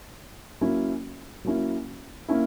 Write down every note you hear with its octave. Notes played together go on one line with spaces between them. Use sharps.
F#3 A#3 C#4 E4
F#3 A#3 C#4 E4
A#3 C#4 E4